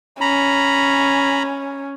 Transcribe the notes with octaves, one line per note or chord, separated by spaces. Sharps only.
C#4 A#5 B5